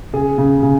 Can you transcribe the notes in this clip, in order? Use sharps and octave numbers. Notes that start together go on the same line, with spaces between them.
C#3 G#4
C#3
C#3